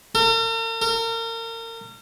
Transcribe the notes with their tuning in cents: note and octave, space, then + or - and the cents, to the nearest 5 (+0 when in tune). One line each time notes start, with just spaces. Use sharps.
A#4 -45
A#4 -35